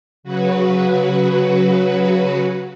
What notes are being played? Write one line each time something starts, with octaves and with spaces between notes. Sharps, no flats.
C#3 F#3 F#4 B4